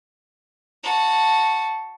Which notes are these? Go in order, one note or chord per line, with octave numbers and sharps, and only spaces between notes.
F#4 A5